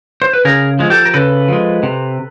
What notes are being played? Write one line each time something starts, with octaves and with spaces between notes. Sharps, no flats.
C5
B4
C#3 G#4 A#4
F3 G#3
G4 A4
A#4
C#3 A4 B4
F3 G#3
C3